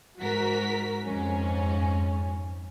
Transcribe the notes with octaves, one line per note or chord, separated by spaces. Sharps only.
G#2 F#4 A#4 B6
F2 G#2 C#4